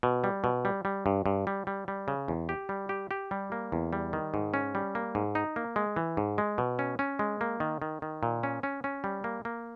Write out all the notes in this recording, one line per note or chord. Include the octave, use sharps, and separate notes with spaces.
B2
G3
B2
G3
G3
G2
G2
G3
G3
G3
C#3
E2
G4
G3
G4
G4
G3
A#3
E2
G3
D#3
G#2
C#4
G3
A#3
G#2
D#4
A#3
G#3
E3
G#2
G#3
B2
C#4
C#4
G#3
A#3
D#3
D#3
D#3
A#2
C#4
C#4
C#4
G3
A#3
A#3